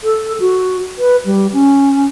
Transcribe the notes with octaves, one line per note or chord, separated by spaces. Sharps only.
A4
F#4
B4
G3
C#4